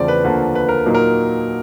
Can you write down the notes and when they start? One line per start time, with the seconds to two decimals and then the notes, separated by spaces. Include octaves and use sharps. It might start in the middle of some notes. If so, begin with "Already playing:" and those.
Already playing: E2 C#3 F3 A3 C4 D5
0.08 B4
0.24 D2 D3 F3 A#3 B4
0.55 B4
0.69 A#4
0.86 A#2 F#3 A#3 D#4
0.95 A#4